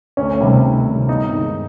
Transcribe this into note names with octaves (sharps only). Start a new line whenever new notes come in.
D2 C#4
C3 D#3 G3
D2
C3 D#3 G3
G1 D#4
G2 D#3 G#3